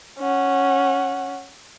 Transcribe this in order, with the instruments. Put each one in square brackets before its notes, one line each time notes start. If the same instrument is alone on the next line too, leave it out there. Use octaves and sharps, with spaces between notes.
[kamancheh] C#4 F#5